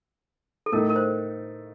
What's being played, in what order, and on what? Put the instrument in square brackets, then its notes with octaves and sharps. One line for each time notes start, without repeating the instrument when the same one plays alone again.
[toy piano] A4
[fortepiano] A2 A3 D#4 [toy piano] A#4
[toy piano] A#4
C5